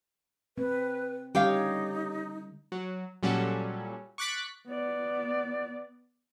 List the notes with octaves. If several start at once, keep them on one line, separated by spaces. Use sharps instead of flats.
C4 B4
D3 G3 C#4 D#4 G4 C#5 F5
F#3
A#2 F#3 G3 C#4 F#4 A4
C#6 D6 F#6 A6 B6 D7
B3 D5